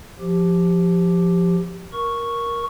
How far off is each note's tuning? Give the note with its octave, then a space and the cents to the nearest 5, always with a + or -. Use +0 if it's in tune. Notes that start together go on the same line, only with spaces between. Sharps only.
F3 +0 G4 +0
A#4 +10 C#6 +0